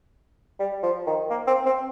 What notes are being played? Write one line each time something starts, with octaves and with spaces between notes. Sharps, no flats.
G3
F3
D#3
A#3
C4
C4